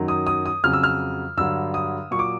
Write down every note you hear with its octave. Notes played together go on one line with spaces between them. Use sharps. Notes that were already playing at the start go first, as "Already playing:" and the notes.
Already playing: F#2 D#3 F#3
D#6
D#6
D#6
F2 C#3 F#3 F6
E6
F6
G2 D3 F#3 E6
D#6
A#2 F#3 C#6
D6